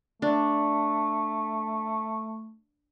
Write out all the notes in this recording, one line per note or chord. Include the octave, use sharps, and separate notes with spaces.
A3 D4